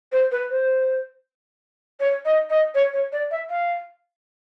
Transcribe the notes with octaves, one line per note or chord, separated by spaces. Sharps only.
C5
B4
C5
C#5
D#5
D#5
C#5
C#5
D5
E5
F5